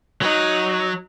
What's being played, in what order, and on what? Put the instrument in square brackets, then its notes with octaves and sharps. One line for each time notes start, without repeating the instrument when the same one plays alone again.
[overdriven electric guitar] F#3 [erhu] D#4